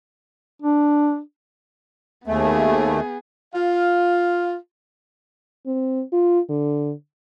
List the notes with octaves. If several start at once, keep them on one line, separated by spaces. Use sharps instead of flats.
D4
D#2 A3 B3 G#4
F4 F5
C4
F4
D3